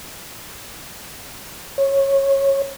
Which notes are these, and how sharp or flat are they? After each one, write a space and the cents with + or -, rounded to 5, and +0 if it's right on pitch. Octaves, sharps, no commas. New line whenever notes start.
C#5 -15